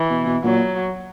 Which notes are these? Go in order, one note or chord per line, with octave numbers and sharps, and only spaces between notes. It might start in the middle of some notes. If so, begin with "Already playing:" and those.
Already playing: E3
B2
B2
A#2 F#3